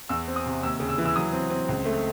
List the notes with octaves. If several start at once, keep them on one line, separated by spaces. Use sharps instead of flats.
E2 E6
C4
D#6
C3
D#2 E6
C#3
E6
E3
E6
F#3 D#6
C4
C4
C#2
A3